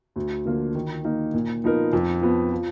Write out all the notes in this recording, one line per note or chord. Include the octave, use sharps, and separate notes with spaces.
D2
D3 F3 A#3 F4
D#3
A#3 D#4
A#2
F3 B3 D#4 A#4
F2
F3 B3
F3